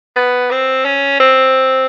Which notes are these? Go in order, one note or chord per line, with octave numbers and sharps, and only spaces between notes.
B3
C4
C#4
C4